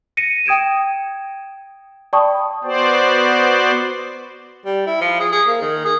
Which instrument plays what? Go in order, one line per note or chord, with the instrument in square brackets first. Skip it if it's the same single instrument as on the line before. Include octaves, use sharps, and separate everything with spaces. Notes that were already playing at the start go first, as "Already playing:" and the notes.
[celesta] A#6 C#7 D#7
G5 D#6 G#6 D7 E7
D5 G5 A5 B5 C#6 D#6
[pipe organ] B3 F#4 C5 D5
[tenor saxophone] G3
E4
F3
G#4
G#4
A#3
D#3
G#4